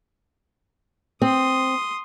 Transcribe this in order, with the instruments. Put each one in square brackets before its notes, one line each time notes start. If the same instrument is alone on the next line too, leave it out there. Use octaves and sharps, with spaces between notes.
[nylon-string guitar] C4 [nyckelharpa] C6 D#6